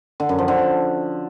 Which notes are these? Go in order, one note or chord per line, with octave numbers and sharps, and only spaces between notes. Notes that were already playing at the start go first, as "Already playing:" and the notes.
D3
F#2
F3
D3